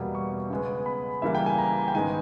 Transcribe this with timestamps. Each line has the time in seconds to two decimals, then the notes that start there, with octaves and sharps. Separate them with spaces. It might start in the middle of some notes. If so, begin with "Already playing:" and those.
Already playing: E2 B2 G3 A#3
0.15 C#6
0.50 C#3 G#3 B3
0.86 B5
1.22 C#3 E3 G3 A#3 E5
1.35 G5
1.46 G#5
1.58 A#5
1.88 G5
1.94 G#2 D#3 G#3 B3 G#5